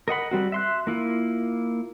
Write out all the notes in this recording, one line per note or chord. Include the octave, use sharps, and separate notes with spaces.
A#4 D#5 F#5 B5
G3 C4 F#4
E5 C6 F#6
A#3 E4 F4